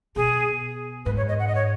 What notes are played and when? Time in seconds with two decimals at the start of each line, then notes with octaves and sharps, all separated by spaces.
0.16 B2 G#4
1.06 G#2 B4
1.17 C#5
1.29 D#5
1.39 F#5
1.48 D#5
1.55 C#5